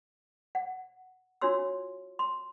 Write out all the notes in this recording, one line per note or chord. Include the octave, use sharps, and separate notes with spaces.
F#5
D4 F4 F#4 C#5 C6 E6
C6